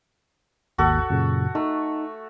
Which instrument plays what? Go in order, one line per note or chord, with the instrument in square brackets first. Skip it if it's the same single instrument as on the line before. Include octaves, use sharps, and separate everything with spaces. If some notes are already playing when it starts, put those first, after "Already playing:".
[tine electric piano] G#1 D#2 G#2 [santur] F#4 A4
[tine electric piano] F#2 A#2 C#3
[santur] A3 [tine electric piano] D#4